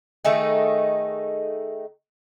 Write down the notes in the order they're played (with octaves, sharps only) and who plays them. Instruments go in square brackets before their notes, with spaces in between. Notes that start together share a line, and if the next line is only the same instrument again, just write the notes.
[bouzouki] D#3 A3 D#4 G#4